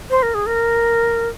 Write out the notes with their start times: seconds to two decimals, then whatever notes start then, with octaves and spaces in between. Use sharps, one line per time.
0.10 C5
0.23 A#4
0.34 G#4
0.46 A#4